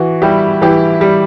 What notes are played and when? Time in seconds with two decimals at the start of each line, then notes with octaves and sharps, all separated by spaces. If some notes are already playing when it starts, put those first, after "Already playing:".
Already playing: E3 F#4
0.22 G3 E4 G4
0.61 E3 E4 G4
1.01 G3